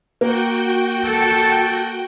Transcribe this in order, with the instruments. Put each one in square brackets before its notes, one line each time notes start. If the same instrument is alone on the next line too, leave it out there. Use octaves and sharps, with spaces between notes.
[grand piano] A#3 [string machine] F#4 G5
[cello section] A4